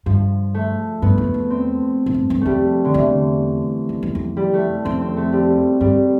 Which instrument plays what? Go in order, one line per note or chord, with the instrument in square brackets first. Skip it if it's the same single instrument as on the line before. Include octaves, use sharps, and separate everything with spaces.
[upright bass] G2 [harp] F3
[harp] A3
[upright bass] G2 [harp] B3
[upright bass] F2
E2
[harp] C4
[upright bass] A2
G2
G2
[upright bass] F2 [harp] G3 A3
[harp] D3
[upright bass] E2 [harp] E3
[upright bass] F2
E2
F2
[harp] G3
A3
[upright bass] F2 [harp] C4
[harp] C4
A3
G3
[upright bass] G2 [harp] G3